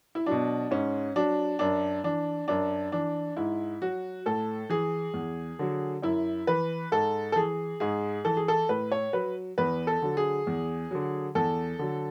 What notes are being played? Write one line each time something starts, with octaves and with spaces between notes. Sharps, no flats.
E4
B2 F#3 D4
G#2 C#4
F#3 D4
F#2 D4
E3 D4
F#2 D4
E3 D4
G#2 E4
F#3 F#4
A2 A4
E3 G#4
E2
D3 F#3
F#2 E4
E3 B4
G#2 A4
A4
E3 G#4
G#2 G#4
E3 A4
G#4
A4
A2 B4
C#5
F#3 B4
E2 B4
A4
D3 F#3
G#4
E2
D3 F#3
E2 A4
D3 F#3